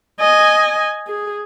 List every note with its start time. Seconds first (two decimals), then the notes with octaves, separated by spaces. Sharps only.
0.20 D#5 G#5
1.07 G#4